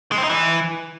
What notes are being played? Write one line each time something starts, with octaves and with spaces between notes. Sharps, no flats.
G#3
C4
D#4
E3